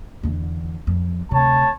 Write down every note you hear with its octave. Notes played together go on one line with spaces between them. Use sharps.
E2 D3
F2
D2 C3 C#5 A5